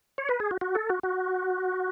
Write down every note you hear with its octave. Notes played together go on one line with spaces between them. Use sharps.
C#5
B4
G#4
F#4
F#4
A4
F#4
F#4